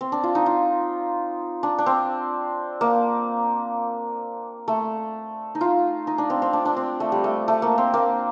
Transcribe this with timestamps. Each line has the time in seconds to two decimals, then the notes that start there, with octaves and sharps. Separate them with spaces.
0.01 C4
0.12 D4
0.23 F4
0.35 D#4
0.46 F4
1.63 D4
1.78 D4
1.86 C4
2.81 A#3
4.68 A3
5.55 D#4
5.61 F4
6.07 D#4
6.18 D4
6.30 C4
6.42 C4
6.53 D4
6.65 D4
6.77 C4
7.00 A3
7.12 G3
7.24 A3
7.48 A3
7.62 A#3
7.78 C4
7.94 A#3